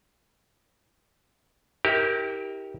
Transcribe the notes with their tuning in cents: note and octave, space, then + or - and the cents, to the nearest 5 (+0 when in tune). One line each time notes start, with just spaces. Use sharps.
E4 -45 G4 +0 A#4 +0